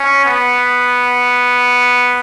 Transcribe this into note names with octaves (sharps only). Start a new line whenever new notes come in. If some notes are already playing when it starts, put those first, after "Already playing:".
Already playing: C#4
B3